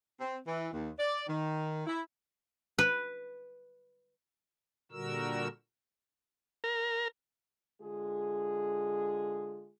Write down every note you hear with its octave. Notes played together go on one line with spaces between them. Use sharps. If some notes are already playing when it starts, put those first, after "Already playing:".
C4
E3
D#2
D5
D#3
E4
B4
A#2 D3 G3 F#4 A#4 E6
A#4
D3 G#3 F4 G#4